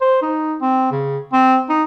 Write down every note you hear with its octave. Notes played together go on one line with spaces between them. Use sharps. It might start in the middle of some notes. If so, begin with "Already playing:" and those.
C5
D#4
C4
C#3
C4
D#4